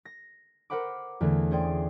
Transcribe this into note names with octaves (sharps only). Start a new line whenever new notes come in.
A#6
A#4 C5 F#5 B5 D6
E2 D3 E3 A3
C#4 G#4 C5 D5 G5 C6